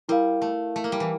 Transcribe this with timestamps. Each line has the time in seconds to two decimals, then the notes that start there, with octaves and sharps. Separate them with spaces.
0.09 G3 E4 A#4 F5
0.42 A3
0.76 A3
0.84 A#3
0.92 G3
1.00 E3